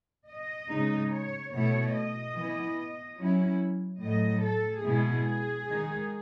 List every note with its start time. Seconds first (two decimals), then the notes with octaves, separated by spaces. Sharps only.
0.27 D#5
0.69 C#3 G#3 D#4
1.11 C#5
1.52 B2 A3 E4 C#5
1.94 D#5
2.35 E3 B3 E4
3.18 F#3 C#4 E4
4.02 A2 F#3 A3 D#5
4.43 A4
4.84 B2 G#3 B3 E4 G#4
5.68 D#3 G#3 D#4